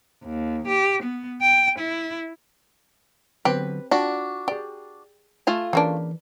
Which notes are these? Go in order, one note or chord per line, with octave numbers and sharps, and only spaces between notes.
D#2
G4
B3
G5
E4
D3 F#3 B3 C4 G4 B4
D4 F4 F#4 G5
G4 G#4 D5
A3 F4 G#5
C#3 E3 A#3 D4 B4